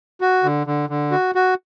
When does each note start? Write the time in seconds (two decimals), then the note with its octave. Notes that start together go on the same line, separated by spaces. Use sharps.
0.21 F#4
0.44 D3
0.67 D3
0.89 D3
1.11 F#4
1.35 F#4